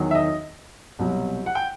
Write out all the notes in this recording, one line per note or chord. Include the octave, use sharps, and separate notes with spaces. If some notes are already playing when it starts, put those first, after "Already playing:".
Already playing: E2 D#3 F#3
E5
D#5
C2 B2 F#3
F#5
G5